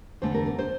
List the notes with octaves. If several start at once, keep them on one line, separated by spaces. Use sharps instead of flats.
E2 D3 A3 C5
A#4
A#4
C5